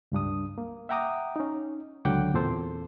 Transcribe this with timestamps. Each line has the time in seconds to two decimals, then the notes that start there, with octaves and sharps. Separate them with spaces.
0.12 C#2 G2 D4 D#6
0.58 A#3
0.89 E5 F#5 G5 A#5 D6 D#6
1.36 C#4 D#4
2.05 C#2 D3 F#3 F#5 G5 D6
2.34 E2 A#2 C4 A4 C5